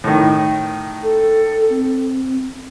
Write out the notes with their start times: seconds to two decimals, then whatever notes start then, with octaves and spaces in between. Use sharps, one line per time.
0.04 A2 D#3
1.03 A4
1.70 C4